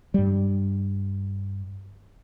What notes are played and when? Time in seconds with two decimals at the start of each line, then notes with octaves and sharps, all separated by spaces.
0.14 G2 G3